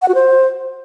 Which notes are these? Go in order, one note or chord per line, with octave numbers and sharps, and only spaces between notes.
F#5
F#4
C5